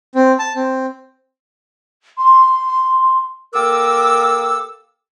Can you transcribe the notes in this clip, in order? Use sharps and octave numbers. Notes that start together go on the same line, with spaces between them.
C4
A5
C4
C6
A#3 G4 A4 A#4 D6 E6